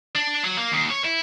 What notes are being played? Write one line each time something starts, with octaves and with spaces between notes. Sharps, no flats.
D4
F#3
A#3
D#2
C#5
E4